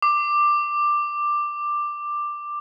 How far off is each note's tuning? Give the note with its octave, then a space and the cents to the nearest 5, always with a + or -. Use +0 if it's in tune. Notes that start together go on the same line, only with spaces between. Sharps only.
D6 +10